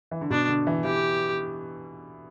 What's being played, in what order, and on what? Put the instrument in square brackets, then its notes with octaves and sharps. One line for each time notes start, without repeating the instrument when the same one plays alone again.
[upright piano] E3
D3
[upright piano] B2 [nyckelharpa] D4
[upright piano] D3
E3
[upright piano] E3 [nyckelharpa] G4